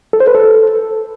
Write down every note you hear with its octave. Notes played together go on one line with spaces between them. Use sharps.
A4
C5
B4
A4